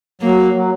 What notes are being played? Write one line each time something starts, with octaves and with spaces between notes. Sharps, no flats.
F#3 A#3
F#3